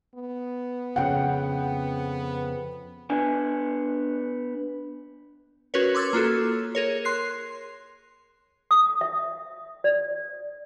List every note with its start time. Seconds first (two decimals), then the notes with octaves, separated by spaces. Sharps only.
0.15 B3
0.96 F2 C#3 F#5 G5
3.10 B3 D4 G#5
5.74 C#4 F#4 A#4 B4 C#5
5.94 C6 D6 E6 G#6 A6
6.13 A#3 F4 F#4 A4
6.75 G#4 A#4 C#5
7.05 C6 F#6 C7
8.71 D#6
9.01 E5
9.84 D5